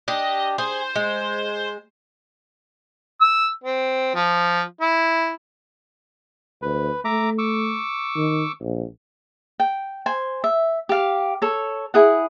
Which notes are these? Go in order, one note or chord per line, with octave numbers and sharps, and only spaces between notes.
D4 G4 D#5
G#4 C5
G#3
E6
C4
F3
E4
D2 B4
A3 E5 A#5 D6
C#6 D6 E6
D#3
A#1
G5
C5 G#5
E5
G4 F5
A4 C#5
E4 G#4 F#5